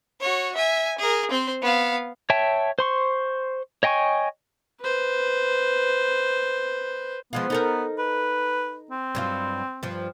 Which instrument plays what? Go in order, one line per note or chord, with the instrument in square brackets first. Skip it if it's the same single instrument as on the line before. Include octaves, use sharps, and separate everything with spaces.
[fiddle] F#4 C#5
E5 G#5
G#4 A#4
C4 C5
B3 F5
[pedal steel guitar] C#5 E5 G5 A5
C5 C6 C#6
C#5 D#5 G5 G#5 C#6
[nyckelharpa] B4 C5
[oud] F3 G#3 F4 [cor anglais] B3
[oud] D#4 A4 A#4
[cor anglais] B4
C4
[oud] G2 F#3 F4
G2 F3